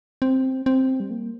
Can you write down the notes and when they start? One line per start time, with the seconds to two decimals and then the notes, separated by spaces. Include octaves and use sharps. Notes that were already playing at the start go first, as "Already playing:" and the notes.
0.22 C4
0.66 C4
1.00 G3
1.11 A#3